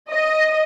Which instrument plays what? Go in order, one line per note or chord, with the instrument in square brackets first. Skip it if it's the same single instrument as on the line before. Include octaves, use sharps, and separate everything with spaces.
[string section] D#5